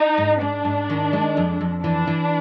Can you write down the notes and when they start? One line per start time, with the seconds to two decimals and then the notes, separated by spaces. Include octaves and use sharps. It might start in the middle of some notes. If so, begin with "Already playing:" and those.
Already playing: D#4
0.18 G#2
0.41 G#2 D4
0.65 G#2
0.90 D#3
1.13 G#3
1.37 F2
1.61 F2
1.83 E3 D4
2.07 E3